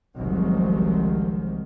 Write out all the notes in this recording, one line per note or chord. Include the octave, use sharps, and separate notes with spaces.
F#1 C2 D#3 F3 F#3 G#3